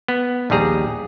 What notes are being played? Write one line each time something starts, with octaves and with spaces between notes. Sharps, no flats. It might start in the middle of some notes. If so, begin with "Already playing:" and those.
B3
A#1 D#2 G3 G#4 A#5